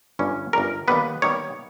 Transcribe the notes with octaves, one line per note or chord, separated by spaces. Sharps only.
G1 G2 G3 C#4
G1 G2 G3 C#4 A#4
D#2 D#3 G3 B3 B4
D#2 D#3 G3 B3 C#5